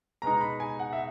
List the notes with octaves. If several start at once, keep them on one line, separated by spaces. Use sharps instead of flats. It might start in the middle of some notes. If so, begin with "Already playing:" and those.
B2 G#3 B3 D#4 A#5
B5
G#5
F#5
E5